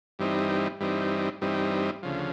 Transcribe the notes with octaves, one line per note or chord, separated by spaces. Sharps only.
G2 E3 G3 C4 D#4
G2 E3 G3 C4 D#4
G2 E3 G3 C4 D#4
D2 C#3 F3